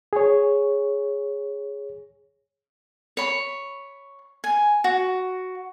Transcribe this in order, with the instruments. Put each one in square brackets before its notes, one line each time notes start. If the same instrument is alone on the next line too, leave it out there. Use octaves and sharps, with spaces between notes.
[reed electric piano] G#4 C#5
[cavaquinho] C#5 B5
G#5
F#4